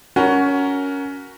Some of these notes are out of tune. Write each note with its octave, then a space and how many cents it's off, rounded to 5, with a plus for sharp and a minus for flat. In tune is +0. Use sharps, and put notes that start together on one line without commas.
C#4 +15 F#4 +0 A#4 +0